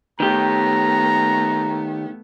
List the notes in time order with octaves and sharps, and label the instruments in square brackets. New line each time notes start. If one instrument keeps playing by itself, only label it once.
[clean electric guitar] D#3 G4 [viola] A3 B3 [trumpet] A#5